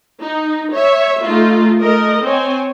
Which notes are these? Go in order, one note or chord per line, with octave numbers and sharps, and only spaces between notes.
D#4
C#5 E5
A3 D#4 F4
A3 A#4 D#5
C4 C#5 G#5